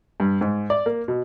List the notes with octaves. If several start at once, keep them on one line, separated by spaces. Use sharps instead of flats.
G2
G#2
D5
A#3
B2